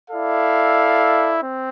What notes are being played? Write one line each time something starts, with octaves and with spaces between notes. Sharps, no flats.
E4 A4 D5 F5
C4